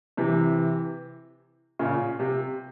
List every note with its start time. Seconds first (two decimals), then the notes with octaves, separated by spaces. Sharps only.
0.17 C3 E3
1.79 A#2 C#3
2.19 C3